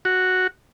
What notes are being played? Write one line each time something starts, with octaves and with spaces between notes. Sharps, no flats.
F#4